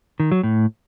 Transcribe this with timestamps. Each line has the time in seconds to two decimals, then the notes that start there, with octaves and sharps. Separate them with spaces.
0.20 D#3
0.32 F#3
0.43 A2